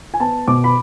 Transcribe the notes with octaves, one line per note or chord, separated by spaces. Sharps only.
G#5
B3 A5
B2 D6
B5